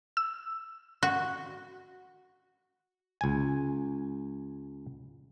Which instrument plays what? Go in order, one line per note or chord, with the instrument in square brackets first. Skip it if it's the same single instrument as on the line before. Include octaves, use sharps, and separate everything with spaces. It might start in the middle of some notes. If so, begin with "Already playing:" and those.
[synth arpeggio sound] E6
[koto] F#4
[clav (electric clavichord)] C#2 G#5